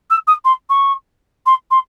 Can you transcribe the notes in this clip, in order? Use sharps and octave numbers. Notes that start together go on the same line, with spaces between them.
E6
D#6
C6
C#6
C6
C6